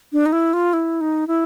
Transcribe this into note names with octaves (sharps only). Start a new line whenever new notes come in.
D4
D#4
E4
F4
E4
D#4
E4